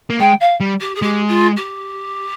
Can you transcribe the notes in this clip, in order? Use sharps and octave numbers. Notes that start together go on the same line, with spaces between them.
A#3
G#3 G5
F5
G3
G4
G#4
G#3 G4
F4
G4